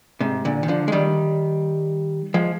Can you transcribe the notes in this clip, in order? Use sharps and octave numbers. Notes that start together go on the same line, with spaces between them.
G#2 C3
A#2 D3
D#3
D3 F3
G#3
D#3 G3
F3 G#3